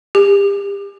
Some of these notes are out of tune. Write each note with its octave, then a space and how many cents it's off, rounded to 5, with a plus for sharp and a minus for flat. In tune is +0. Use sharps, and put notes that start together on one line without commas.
G4 +35